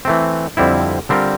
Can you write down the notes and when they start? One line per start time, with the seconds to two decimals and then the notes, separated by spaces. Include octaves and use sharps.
0.05 E3 A3 C4
0.57 F2 D3 G3 C4 E4
1.09 D3 G3 C4 F4 A#4